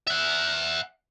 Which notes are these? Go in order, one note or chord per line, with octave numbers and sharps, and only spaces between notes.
E5 F#5